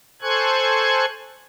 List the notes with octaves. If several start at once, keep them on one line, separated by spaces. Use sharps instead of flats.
A4 C5 G#5 C#6 F#6 G#6